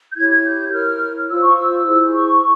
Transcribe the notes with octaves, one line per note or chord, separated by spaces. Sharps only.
G6
E4 G4 C#5 G#6
G#6
G6
E4 A#4 C#5 F6
F4 C5 E6
C#6
E6
E4 G#4 C5
C#6